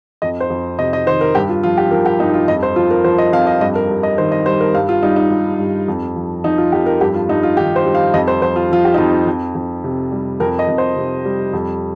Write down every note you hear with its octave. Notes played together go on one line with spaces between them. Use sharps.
F2 D#5
C5
F2
C3 D#5
D#5
D#3 C5
A#4
G2 G4
F4
F3 F4
G4
F3 A#4
G4
G2 D#4
F4
F2 D#5
C5
F3 F4
A#4
F3 C5
D#5
F2 F5
D#5
G2 D#5
A#4
G2
D#5
D#3 C5
D#5
G3 C5
A#4
G2 F5
F4
G3 D#4
D#4
G3
G2
F2
F3
F3 D#4
F4
F2 G4
A#4
G2 G4
F4
G2 D#4
F4
D#3 G4
C5
G3
F5
F2 D#5
C5
F3 C5
F4
F3 F4
G4
D#4
F2 F4
F2
F2
C3
G3
F2 A#4
D#5
F2
C5
C3
G3
F2